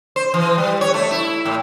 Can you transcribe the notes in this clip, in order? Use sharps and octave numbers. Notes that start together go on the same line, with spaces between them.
C5
E3
G3
C#5
A3
E4
A2